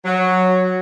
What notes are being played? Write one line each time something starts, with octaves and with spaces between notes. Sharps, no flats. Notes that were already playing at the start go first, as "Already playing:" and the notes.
F#3